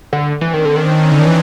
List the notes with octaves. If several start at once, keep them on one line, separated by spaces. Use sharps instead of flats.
D3 G3 A3
E3 C4 D4
D#3
D3 C#4 D#4
D#3
D4 E4
D3
D#3
E3